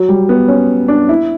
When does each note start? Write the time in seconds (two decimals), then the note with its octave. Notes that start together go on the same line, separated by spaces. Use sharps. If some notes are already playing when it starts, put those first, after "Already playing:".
Already playing: F#3
0.09 G3
0.29 B3
0.48 C#4
0.88 D4
1.09 E4